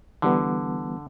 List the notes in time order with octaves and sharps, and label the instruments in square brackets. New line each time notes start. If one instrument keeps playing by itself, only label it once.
[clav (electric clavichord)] D3 [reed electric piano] E3 G3 B3